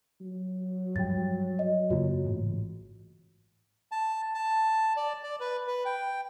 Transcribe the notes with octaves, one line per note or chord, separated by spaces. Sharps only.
F#3
G2 F3 G3 G5 A6
D#5
F#2 C#3 A#3 F4 F#4 C#5
A1 G#2
A5
A5
D5
D5
B4
B4
G5